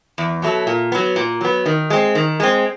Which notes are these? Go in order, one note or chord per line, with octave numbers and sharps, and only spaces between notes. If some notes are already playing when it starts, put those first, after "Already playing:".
E2
B2 F#3 A3
A#2
F#3 B3
A#2
F#3 B3
D#3
G#3 C4
D#3
G#3 C4